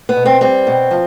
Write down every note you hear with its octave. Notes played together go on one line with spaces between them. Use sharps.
B3
B2
C4
G3 C4
B2
F3